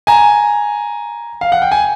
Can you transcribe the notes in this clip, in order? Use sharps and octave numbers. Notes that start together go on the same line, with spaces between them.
G#5 A#5
F5
F#5
G5
G#5